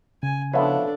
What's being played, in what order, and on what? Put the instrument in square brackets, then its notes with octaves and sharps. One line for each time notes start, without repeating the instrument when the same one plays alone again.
[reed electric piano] C#3 [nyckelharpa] G#5
[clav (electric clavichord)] F3 B3 E4 [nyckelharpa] D4 A4 [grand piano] B4 C#5 E5